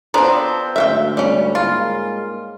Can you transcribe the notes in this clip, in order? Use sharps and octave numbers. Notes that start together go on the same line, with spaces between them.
F3 B3 C4 D4 A#5
D2 G#2 E5 F5 G5
G3 C#4
G#2 G#3 A#3 F4